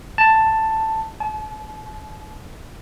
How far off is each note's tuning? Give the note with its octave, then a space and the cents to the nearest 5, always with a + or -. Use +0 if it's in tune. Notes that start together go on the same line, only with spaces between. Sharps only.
A5 +5
A5 -40